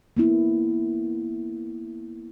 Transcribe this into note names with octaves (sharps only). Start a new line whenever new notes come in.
A#3 B3 E4